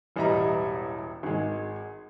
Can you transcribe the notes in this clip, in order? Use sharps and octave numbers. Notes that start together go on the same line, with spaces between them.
E1 A1 G3 D#5 E5 A#5
G#1 G#3